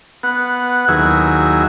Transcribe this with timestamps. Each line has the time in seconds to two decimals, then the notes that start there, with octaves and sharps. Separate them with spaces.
0.23 B3 F#5
0.88 D#2 F#3 E4 G#4